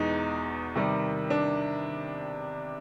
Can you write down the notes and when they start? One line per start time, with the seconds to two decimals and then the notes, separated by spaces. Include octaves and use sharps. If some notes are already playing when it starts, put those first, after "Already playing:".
Already playing: E2 B2 G#3 D#4
0.75 C3 D#3 G3
1.30 D4